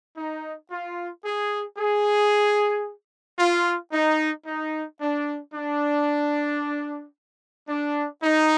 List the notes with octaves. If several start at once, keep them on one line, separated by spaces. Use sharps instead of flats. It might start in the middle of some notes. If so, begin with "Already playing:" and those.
D#4
F4
G#4
G#4
F4
D#4
D#4
D4
D4
D4
D#4